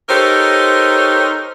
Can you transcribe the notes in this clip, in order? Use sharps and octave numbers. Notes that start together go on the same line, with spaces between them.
D#4 G4 A4 A#4 C5 C#5